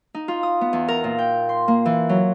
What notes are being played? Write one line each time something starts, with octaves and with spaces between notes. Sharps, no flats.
D#4
F4
D#6
B3
E2
A#4
A#2
G5
C6
A#3
E3
F#3